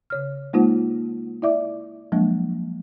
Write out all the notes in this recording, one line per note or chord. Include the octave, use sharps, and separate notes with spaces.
C#3 C#5 F6
G#3 A#3 D#4 F4 C5 F#5
E4 D5 E5 D6
F3 F#3 G#3 A#3 D4